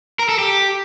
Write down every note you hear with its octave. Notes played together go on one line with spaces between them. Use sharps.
A#4
A4
G4